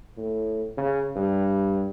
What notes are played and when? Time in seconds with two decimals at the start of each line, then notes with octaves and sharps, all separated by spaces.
0.17 A2
0.77 C#3
1.16 G2